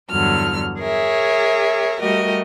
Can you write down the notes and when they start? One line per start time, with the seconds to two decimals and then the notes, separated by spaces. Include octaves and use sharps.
0.11 E2 G2 D3 F#3 F6
0.80 G#4 A#4 C#5 E5
2.01 G3 A3 F#4 G4 A#4 D#5